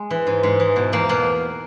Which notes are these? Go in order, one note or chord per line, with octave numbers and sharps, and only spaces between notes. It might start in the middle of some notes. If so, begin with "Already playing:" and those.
Already playing: G#3
E3
G#2
G#2
E3
B2
E2 A#3
B2 A#3